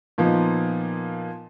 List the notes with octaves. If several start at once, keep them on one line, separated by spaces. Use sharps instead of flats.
A#2 F3 B3 D#4